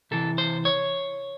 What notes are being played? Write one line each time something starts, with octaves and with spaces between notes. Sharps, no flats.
C3 E3 A4
C5
C#5